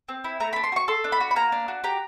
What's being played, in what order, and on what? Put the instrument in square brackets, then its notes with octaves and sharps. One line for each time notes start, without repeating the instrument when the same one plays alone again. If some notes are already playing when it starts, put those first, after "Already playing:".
[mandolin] C4
E4
A3 A#5
B5
D4
C6
F#4 C#6
A4 C6
D4
B5
F#4
B5
A#3 A#5
D4
F#4
G4 A#5